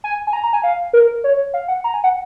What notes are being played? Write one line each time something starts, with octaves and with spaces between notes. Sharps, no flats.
G#5
G#5
A#5
A#5
G#5
F5
A#4
C#5
F5
F#5
A#5
G#5
F#5